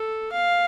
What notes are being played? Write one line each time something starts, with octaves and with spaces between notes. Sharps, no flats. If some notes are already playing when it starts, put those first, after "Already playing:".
Already playing: A4
F5